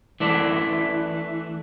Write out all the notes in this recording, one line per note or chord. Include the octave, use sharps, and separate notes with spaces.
E3 A3 D4